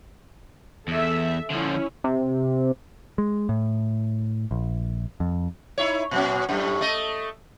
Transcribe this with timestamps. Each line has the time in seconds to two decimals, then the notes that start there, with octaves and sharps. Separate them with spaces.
0.88 E2 A4 E5
1.51 D3 F3 C#4 E4
2.04 C3
3.18 G#3
3.49 A2
4.51 A#1
5.20 F2
5.78 D#4 E4 C#5
6.11 A#2 F#3 C#4
6.49 F#2 A2 G3
6.81 A3 A4 D#5